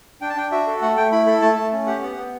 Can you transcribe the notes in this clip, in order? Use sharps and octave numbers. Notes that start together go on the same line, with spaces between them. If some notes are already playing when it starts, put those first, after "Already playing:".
D4 G5
A5
D4 G5
F#4 E5
A4
A3 F#5
A3 G5
E4 B5
A4 B5
A3 A5
A3 A5
C#4
G4 F#5
B3 F#5
B3